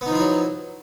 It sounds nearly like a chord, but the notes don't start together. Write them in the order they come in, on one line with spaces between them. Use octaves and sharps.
B3 D#4 F3 E4 F#3